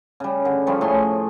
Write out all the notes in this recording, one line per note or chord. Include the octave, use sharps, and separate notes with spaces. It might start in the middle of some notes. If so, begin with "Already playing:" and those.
C#3 G3
D3
C#3 F3 G3 C#4
A2 A3 G#4 C6